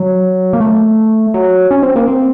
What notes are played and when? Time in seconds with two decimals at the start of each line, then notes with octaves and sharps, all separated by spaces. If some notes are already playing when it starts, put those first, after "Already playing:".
Already playing: F#3
0.53 A#3
0.60 A3
1.34 F#3
1.71 C#4
1.83 C4
1.96 A#3
2.07 C4